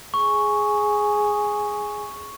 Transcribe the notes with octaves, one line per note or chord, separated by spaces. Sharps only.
G#4 C#6